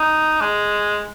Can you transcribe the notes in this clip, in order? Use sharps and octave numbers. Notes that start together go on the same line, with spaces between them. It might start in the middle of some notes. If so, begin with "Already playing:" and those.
Already playing: D#4
G#3